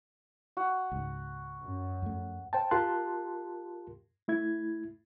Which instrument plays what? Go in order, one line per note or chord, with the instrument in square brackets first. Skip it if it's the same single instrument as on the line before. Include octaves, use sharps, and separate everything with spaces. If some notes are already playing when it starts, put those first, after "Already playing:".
[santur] F#4
[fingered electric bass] C#2 G#2
[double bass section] F#2
[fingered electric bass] F2 A3
[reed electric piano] C5 G5 A5
F4 G4 A#4 A5 C6 F#6
A3 E4 G#6